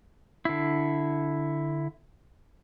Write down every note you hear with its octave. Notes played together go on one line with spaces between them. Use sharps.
D3 E4